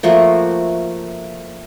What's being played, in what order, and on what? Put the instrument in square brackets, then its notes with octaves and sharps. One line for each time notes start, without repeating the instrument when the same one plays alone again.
[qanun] F3 A3 A#3 F#4